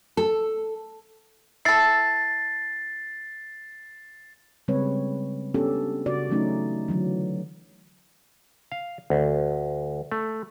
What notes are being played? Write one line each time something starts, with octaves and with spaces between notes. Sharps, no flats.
A4
E4 A4 A6 C7
C#3 G3 G#3 C4 B4 C#5
B3 C#4 D4 G4 A4
C#3 F#4 D5
E3 F#3 A3 C#4 D#4
D3 E3 F#3
F5
D2
A3